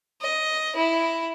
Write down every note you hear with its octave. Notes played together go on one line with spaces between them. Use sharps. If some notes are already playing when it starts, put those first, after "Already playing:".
D#5
E4